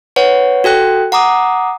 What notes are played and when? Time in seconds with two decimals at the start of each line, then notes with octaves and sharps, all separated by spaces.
0.16 B4 C#5 F#5
0.64 F#4 A4 G5 F#6
1.12 F#5 A#5 D6 D#6